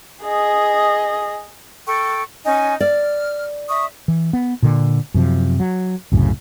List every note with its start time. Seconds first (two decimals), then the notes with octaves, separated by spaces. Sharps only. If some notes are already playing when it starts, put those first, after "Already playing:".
0.23 G#4 D#5
1.87 A4 G5 C#6
2.44 C#4 D#4 G#5
2.80 D5 F6
3.68 E5 C#6 D#6
4.08 E3
4.33 B3
4.63 A#2 D3
5.14 F#2 C3 F3
5.60 F#3
6.12 C2 F#2 A2 C#3